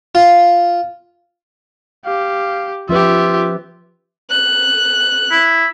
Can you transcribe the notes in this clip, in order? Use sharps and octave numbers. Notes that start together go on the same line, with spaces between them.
F4
G4 F5
F3 C#4 F4 G4 B4 E5
F#6
E4